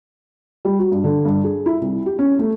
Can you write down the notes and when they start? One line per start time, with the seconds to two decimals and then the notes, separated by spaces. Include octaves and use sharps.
0.65 G3
0.79 F#4
0.91 G2
1.04 D3
1.25 G2
1.44 G#4
1.66 E4
1.81 C2
2.06 G4
2.19 C#4
2.39 A3